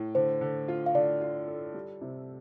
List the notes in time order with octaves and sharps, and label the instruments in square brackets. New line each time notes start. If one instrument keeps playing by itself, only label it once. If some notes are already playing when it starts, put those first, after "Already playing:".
Already playing: [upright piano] A2
[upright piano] D3 [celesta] C5
[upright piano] D3
F4
[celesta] F5
[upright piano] D3 [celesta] D5
[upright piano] F4
A4
G3
C3